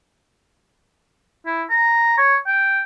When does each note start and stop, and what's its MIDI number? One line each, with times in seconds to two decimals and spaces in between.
1.46 1.63 64
1.70 2.15 82
2.18 2.36 73
2.47 2.81 79